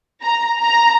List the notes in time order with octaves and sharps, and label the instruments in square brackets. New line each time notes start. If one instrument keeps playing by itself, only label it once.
[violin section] A#5
A#5